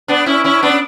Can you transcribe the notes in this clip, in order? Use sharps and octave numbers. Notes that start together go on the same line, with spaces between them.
B3 D4
C#4 E4
C#4 E4
B3 D4